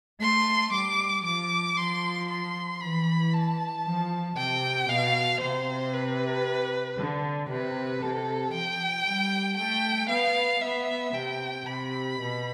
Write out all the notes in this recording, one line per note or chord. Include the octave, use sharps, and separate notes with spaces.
A3 C6
G3 D6
F3 D6
F3 C6
C6
E3 B5
A5
F3
C3 G5
B2 F5
C3 C5
B4
D3
C3 B4
C3 A4
F3 G5
G3
A3 G5
B3 F5
B3 E5
C3 G5
C3 B5
B2